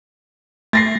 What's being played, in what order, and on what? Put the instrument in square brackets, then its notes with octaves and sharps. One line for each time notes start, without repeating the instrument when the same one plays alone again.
[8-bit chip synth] A3 [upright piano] A6 A#6 C7